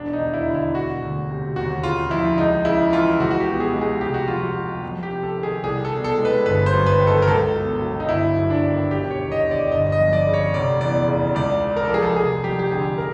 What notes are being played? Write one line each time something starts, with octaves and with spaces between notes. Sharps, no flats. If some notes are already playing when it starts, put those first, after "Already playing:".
Already playing: E1 D4
D#4
D#2
E4
D3
E4
E1 F#4
D2
C3
D#2 F#4
C#3 F4
F3 E4
C#2 D#4
C#3 E4
E3 F4
C#2 F#4
F#4
G4
B2
G#4
G#3
G#4
F1 G4
F#4
F2 F4
F#4
C3
F2
G4
C3
A4
D#3
G#4
C2 G#4
A4
B2
A4
G#3
B4
G1 B4
C5
F#2
B4
D#3
A4
A#4
C#2 A4
B2
F#3
D#4
G1 E4
F#2
D4
D#3
E1 G4
C#5
D#2
D#5
D3
D5
G1 D#5
D#5
F2
D5
C#3
C#5
F1 D5
E2 D5
C#3
C#2 D5
C#3
A#4
A4
F3 G#4
A4
F1 G#4
F2 G4
G4
D3 G#4
A#4